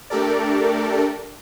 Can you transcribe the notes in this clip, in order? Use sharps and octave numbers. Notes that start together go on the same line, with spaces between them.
A3 D4 G4 A4 A#4 D5